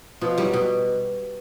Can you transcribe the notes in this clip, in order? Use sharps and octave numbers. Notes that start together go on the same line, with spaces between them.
B2 F3
G3
F#3
B2